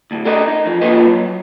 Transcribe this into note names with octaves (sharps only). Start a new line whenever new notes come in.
D2 A2
A4 A#4 D5 D#5
D#4
F2 F3
A#3 F4 A4 B4 D#5
F#3